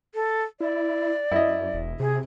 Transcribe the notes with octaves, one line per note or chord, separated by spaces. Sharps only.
A4
E4 D5
F#2 E4 D#5
E1
C3 G#4